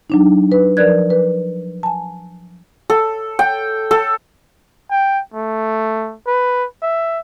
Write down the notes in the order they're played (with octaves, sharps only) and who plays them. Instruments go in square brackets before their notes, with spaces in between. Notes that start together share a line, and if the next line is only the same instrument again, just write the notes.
[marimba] F#3 D4 D#4
B4
F3 A#4 B4 D5 F#6 G#6
B4
G#5 A5
[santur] A4
G5
A4
[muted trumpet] G5
A3
B4
E5